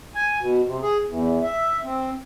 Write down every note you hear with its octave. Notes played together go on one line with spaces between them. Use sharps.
G#5
B2
C3
G#4
E2
E5
C4